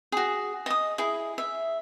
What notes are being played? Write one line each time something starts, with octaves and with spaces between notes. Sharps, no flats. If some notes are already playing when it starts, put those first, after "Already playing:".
F#4 G#4
D#5 D#6
E4 G#4
E5